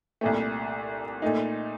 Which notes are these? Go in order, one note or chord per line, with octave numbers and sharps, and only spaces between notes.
C2 A#2 A3
A#2 A3 D#4